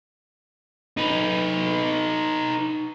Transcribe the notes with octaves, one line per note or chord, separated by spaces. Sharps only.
D#4 B4